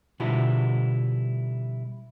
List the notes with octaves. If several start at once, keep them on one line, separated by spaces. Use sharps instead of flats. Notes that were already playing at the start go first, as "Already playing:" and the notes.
B2 D3 F3 G3 E4 F#4